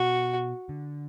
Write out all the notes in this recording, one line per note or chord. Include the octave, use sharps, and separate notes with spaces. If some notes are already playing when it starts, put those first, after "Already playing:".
Already playing: B2 F#4
D3